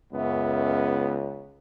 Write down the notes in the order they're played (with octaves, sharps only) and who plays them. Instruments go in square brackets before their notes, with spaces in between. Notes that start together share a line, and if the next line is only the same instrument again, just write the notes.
[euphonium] C#2 [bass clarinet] F#2 [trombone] B3